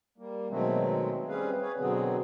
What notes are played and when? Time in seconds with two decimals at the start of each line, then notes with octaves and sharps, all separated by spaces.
0.18 G3 A#3
0.50 B2 D#3 F#3 G#3 A3 C4
1.28 G3 C4 C#4 G#4 B4 F5
1.61 G#4 B4 C#5
1.78 B2 D3 F#3 B3 C4 G#4